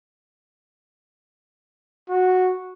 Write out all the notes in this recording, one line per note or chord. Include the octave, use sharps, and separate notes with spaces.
F#4